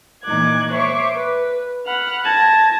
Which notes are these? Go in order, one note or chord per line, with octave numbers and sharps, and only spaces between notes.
A#2 E3 D#4 D6 F#6 G#6
C5 C#5 E5 C#6 D6
B4
F#5 B5 F6
A5 G#6 A#6